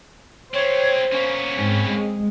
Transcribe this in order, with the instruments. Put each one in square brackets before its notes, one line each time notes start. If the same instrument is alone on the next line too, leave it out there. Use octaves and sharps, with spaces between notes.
[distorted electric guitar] G3 C4 [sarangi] C5 [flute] C#5
[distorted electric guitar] A#3 B3 [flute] C#4
[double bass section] G#2 [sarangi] C4
[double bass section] G#3